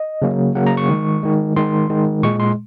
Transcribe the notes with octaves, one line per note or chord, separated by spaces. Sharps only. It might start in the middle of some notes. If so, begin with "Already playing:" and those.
Already playing: D#5
C#3 F#3 A#3
C#3 F#3 A#3 F#5
A#5
C#6
D#3 G#3
D#3 G#3
D#3 G#3 C6
D#3 G#3
A#2 G#3 C#6
C6